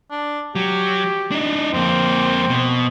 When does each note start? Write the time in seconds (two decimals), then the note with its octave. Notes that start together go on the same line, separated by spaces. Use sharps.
0.11 D4
0.55 F#3 G4
1.31 D4 D#4
1.74 F2 A#3 C4
2.50 B2